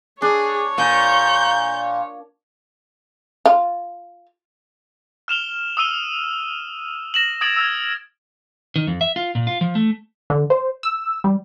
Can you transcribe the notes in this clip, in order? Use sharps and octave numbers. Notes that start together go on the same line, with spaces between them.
D4 G#4 C#5
A#2 G6
F4
F6 E7 F7 G7
D#6 E6 D#7 G7
A#6 E7 F#7
D#6 G#6 A6 D7 F#7
E6 F6 G#6
D#3
F2
E5
F4
A#2
F4
F3
A3
D3
C5
E6
G3